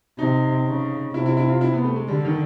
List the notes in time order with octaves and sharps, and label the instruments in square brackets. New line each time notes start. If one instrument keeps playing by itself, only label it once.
[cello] C3 [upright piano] D#4
[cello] C#3
[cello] C3 [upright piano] E4
[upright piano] E4
E4
F4
E4
B3
A3
G#3
[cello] D3 [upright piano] G3
[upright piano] D#3